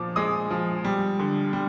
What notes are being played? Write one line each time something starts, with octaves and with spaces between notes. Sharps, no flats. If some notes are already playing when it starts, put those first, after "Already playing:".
Already playing: A#2 F3 D6
G#3 D#6
F3
G3
D3
G3